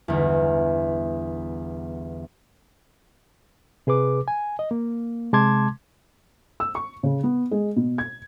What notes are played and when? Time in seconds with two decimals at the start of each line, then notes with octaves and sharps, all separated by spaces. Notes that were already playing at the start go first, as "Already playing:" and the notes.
0.08 G1 E2
3.87 C3 G#4 B4 D6
4.28 G#5
4.59 D#5
4.71 A#3
5.33 C3 G#3 A5 C6 D6 G#6
6.60 E6
6.75 C#6
7.03 C#3
7.23 B3
7.51 G#3
7.76 B2
7.98 G#6